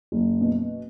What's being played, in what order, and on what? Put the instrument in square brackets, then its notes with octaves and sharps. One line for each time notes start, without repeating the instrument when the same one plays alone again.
[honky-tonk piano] F#1
B2